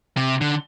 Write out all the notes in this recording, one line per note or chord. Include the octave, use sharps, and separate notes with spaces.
C3
D3